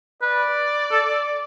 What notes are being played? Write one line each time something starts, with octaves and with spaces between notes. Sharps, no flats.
B4 D5
A4